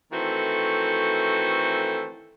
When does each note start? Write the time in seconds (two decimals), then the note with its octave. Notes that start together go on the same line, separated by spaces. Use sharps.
0.12 D#3 E3 A3 C4 F#4 A4